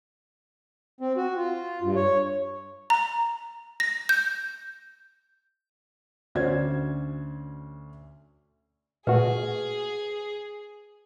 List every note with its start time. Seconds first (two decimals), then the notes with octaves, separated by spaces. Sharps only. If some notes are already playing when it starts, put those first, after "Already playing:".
1.01 C4
1.17 F#4
1.36 F4
1.82 G2
1.96 C#5
2.90 A#5
3.80 A#6
4.09 G6
6.35 D2 C#4 F#4 C5 D5 G#6
9.07 A#2 A3 F#4 G#4 B4